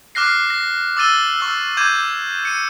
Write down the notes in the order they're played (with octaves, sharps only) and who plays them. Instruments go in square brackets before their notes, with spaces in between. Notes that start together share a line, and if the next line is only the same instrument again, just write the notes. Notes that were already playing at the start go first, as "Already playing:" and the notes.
[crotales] D6 F6 F#6 A#6 C7
A#6
D6 E6 A6 D#7 G7
C#6 E6
D6 G6 G#6 D#7
C#7 D#7